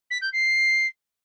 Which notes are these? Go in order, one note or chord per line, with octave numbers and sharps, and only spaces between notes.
B6
G6
C7